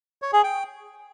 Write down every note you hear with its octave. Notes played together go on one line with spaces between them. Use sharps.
C#5
G#4
G5